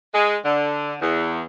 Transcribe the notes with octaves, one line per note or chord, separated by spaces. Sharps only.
G#3
D3
E2